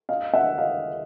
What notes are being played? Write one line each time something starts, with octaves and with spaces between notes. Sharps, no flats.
D#5 F5
E5 F#5
D#5 F5